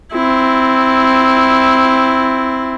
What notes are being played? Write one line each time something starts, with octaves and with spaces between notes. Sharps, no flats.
C4 E4